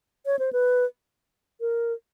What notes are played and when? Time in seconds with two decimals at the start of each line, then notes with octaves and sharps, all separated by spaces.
0.26 C#5
0.39 C5
0.53 B4
1.61 A#4